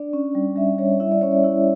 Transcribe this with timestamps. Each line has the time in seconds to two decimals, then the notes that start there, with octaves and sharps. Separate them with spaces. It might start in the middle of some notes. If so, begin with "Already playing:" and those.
Already playing: D4 D5
0.13 C#4
0.35 G3
0.56 G3 E5
0.78 G3 C#5
1.00 E4 E5
1.11 D5
1.21 C#4 C#5
1.32 D5
1.44 E4